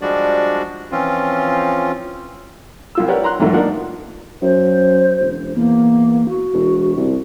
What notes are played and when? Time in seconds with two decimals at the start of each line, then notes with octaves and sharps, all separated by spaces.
0.01 F3 G3 G#3 D4 F#4 D5
0.92 E3 F3 C4 C#4 F4
2.95 C2 F4 E6
3.08 G4 A#4 B4 C#5 D5 F#5
3.24 A#5 C6 F#6
3.40 E2 G#2 D#3 F#3 A3
3.53 A#3 D4 D#4 F4 A#4 F#5
4.42 F#2 C5
5.20 E1
5.55 E2 A#3
6.29 F#4
6.53 E1
6.96 C2